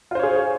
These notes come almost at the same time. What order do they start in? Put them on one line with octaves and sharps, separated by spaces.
F4 C5 C#5 G#4